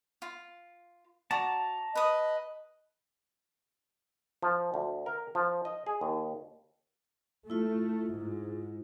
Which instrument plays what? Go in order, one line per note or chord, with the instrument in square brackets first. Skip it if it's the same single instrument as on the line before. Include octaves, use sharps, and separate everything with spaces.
[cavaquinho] F4
[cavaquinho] F#4 D5 [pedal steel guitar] A5 A#5
[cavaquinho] B4 D#6 [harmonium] D#5
[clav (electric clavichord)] F3
D2
A#4
F3
D#5
G#4
D#2
[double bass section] A3 [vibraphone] E4 F4
[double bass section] G#2